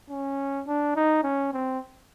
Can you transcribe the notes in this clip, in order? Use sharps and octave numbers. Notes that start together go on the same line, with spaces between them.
C#4
D4
D#4
C#4
C4